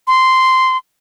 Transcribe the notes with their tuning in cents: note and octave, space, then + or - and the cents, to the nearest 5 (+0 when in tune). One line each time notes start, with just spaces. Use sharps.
C6 -10